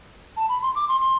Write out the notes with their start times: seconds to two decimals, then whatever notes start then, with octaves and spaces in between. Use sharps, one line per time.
0.36 A5
0.49 B5
0.62 C6
0.75 D6
0.88 C6
1.01 C6